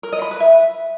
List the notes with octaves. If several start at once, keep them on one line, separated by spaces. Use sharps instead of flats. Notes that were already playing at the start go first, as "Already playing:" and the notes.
A#4
D#5
B5
B4
E5